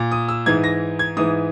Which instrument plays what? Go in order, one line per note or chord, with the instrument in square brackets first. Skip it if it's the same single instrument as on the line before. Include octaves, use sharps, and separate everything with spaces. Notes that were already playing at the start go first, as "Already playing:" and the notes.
Already playing: [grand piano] A#2
D#6
E6
G#2 E3 G#6
A#6
G#6
G#2 E3 D#6